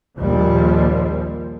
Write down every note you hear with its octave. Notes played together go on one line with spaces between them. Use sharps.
A#1 D#2 F3 G3